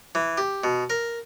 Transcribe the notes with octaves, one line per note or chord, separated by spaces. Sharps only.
E3
G4
B2
A#4